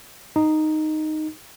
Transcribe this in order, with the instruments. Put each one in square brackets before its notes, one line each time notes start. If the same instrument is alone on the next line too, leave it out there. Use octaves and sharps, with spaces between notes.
[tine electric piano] D#4